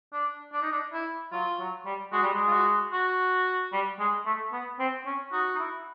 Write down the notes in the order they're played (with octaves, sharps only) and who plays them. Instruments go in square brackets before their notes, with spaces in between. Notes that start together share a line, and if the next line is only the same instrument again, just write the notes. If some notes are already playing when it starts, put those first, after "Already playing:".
[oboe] D4
D4
D#4
D4
E4
[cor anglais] F#3 [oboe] F4
[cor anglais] F#3
G3
[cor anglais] G#3 [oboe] F#4
[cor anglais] G3
G#3
[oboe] F4
F#4
F#4
[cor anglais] G3
G#3
A3
B3
C4
C#4
[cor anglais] D#4 [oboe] F#4
[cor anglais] D#4
E4